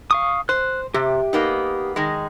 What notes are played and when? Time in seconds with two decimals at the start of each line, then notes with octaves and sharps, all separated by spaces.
0.11 F5 C#6 D#6
0.49 C5 F#6
0.94 C3 G4
1.33 A#3 B3 D#4
1.96 D#3 G#3